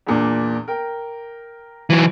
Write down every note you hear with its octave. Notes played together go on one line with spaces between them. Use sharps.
E2 A#2 D4
A#4 G5
E3 F#3